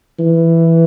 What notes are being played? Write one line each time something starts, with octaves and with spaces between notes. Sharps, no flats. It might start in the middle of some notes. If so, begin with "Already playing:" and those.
E3